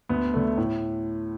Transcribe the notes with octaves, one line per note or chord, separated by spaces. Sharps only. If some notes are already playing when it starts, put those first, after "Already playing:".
D2 B3
D3 A3
A2